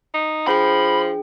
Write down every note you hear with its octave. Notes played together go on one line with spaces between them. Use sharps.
D#4
F3 D4 G#4 G5 B5